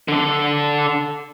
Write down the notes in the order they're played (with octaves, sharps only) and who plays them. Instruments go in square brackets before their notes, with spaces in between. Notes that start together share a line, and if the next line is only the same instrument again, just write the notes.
[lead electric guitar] D3 A4